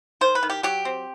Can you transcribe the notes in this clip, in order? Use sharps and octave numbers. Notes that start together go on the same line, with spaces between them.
D#3 C5
B4
D#3
G4
F#3 G4
C4